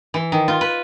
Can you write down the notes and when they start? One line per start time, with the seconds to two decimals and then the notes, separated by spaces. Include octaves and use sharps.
0.14 E3
0.32 D#3
0.48 F4
0.61 B4